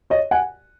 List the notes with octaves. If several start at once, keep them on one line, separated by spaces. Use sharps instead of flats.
C#5 D#5
F#5 G#5